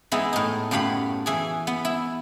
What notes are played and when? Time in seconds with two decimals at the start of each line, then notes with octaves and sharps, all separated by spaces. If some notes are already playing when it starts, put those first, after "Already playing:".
0.12 E3 G#3 B3 D#4 E4
0.33 A2 D#4
0.71 F#2 A2 G4 F5 F#5 B5
1.26 E3 G#4
1.67 B3
1.85 E4